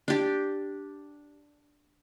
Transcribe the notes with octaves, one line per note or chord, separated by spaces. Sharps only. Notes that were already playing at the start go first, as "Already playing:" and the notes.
D4 G4